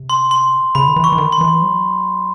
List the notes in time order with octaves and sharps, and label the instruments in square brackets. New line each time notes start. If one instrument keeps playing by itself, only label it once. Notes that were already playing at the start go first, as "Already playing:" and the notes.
Already playing: [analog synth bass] C3
[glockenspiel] C6
C6
[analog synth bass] C#3 [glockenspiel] B5
[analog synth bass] D#3
E3
[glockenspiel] C#6
[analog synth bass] E3
D#3
[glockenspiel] C6
[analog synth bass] E3
F#3